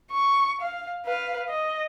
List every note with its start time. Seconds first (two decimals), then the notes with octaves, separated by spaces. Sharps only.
0.11 C#6
0.61 F5
1.05 B4 F5
1.50 D#5